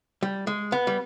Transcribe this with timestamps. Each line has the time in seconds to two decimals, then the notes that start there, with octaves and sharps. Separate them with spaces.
0.23 G3
0.47 G#3
0.72 B3
0.87 G3